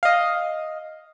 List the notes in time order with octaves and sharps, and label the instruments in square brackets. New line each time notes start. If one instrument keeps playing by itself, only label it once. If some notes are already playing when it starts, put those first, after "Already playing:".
[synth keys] D#5 F5